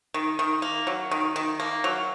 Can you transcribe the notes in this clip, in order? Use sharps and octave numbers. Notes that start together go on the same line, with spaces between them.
D#3
D#3
A#3
F#3
D#3
D#3
A#3
F#3